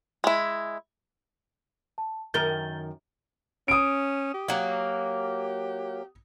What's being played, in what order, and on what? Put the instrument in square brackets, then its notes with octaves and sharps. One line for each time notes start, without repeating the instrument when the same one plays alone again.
[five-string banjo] G#3 E4
[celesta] A5
[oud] F#2 D#3 A#4 [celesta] G6 A6 G7
[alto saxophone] C#4 [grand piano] D#6 D7
[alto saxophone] G4
[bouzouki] F#3 A#3